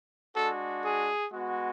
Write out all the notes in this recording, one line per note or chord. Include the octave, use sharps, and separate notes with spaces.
G#3 D4 F#4 A4
G#4
G#3 B3 F#4